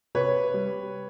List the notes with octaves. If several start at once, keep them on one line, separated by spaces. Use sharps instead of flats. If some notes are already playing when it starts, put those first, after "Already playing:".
C3 B4 C#5
G3